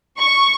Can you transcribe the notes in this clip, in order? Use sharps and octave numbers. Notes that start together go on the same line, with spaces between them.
C#6